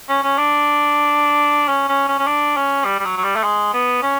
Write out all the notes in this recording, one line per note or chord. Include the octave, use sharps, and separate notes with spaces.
C#4
C#4
D4
C#4
C#4
C#4
C#4
D4
C#4
G3
G3
F#3
F#3
G3
A3
G#3
B3
C#4